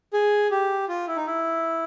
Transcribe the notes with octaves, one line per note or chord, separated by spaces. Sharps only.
G#4
G4
F4
E4
D#4
E4